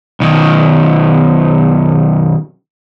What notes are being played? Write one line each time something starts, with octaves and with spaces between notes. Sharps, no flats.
B1 D#3